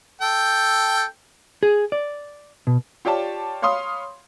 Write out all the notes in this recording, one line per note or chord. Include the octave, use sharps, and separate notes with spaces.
A4 G5
G#4
D5
B2
F4 G4 C#5 D5 A5
C#5 F5 B5 C6 D#6